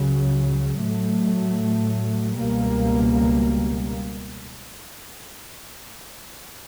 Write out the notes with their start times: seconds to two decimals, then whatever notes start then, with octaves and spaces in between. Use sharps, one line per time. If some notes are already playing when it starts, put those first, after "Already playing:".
Already playing: C#2 C#3 F#3
0.82 A2 F#3 A3
2.38 C#2 B2 G3 A#3